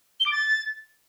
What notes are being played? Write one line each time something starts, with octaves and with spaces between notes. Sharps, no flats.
G7
D6
A6